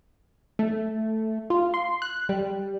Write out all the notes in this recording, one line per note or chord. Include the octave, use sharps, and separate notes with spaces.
A3
F4
C6
F#6
G3